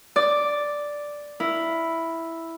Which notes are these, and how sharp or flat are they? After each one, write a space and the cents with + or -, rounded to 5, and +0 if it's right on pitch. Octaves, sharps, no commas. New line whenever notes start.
D5 +0 D6 +0
E4 +0 A#4 +0